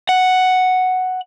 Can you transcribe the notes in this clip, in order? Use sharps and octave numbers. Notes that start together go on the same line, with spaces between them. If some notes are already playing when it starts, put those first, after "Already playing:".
F#5